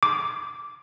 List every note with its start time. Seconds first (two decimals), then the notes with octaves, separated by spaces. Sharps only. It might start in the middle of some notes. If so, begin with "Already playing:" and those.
0.03 D6